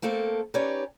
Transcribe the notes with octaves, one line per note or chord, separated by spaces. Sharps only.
A3 A#3 C4 A4
C#4 D#4 G4 B4 C#5 D5